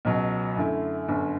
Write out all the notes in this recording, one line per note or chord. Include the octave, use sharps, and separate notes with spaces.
C#2 B2 F#3
F#2 D3 A3 E4
G1 F#2 D3